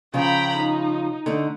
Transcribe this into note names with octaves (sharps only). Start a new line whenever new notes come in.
C#3 F3 F4 G5 A#5 B5
D#4
D3 A3 D#4